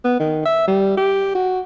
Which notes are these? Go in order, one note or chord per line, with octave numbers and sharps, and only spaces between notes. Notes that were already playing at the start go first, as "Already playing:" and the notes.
B3
D#3
E5
G3
G4
F#4